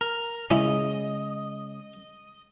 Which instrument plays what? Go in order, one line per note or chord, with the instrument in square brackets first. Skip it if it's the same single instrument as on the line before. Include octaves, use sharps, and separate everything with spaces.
[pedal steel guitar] A#4
[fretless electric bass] C#3 G#3 [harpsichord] C#4 E4 [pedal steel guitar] D#5